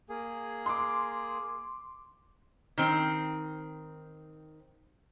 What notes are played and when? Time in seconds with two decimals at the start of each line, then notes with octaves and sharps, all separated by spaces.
0.09 A#3 G#4
0.66 C6 D6
2.78 D#3 C4